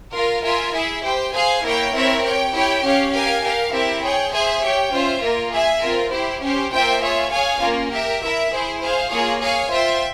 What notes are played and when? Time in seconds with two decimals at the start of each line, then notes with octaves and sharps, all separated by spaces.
0.14 F4 A#4 F5
0.45 F4 A#4 E5 G#5
0.75 E4 G#4 E5
1.04 G4 C5 G5
1.34 G#4 C5 F5 G#5
1.64 A#3 E4 A#4 C#5 G5
1.94 C4 E4 A#4 C#5 E5
2.24 G4 C#5 G5
2.53 E4 G4 C#5 G5
2.83 C#4 G4 C#5 F5
3.13 G4 A#4 F5 G#5
3.43 G4 A#4 F5
3.73 C4 E4 G4 A#4 E5
4.03 G#4 C#5 G5
4.33 G#4 C5 E5 G#5
4.63 G4 C#5 G5
4.93 C#4 F4 C5 E5
5.23 A#3 F4 A#4
5.52 G#4 E5 G#5
5.82 C4 F4 A#4
6.12 E4 G4 C5
6.42 C#4 G4 C5
6.72 A#3 F4 C5 E5 G5
7.01 F4 G#4 C#5 E5
7.31 G#4 C#5 F5 G#5
7.61 A#3 C#4 F4
7.91 G4 A#4 E5
8.21 E4 A#4 E5
8.51 E4 G#4 C5
8.81 G#4 C5 F5
9.11 A#3 F4 G#4 C#5
9.40 G#4 C#5 F5 G#5
9.70 F4 C5 E5 G5